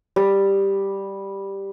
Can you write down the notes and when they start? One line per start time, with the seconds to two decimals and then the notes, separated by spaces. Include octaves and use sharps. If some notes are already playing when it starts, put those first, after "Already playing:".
0.16 G3 D#6